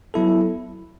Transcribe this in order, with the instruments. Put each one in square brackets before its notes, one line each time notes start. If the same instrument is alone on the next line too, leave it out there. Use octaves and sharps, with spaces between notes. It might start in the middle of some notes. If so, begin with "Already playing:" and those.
[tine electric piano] F#3 B3 E4 A4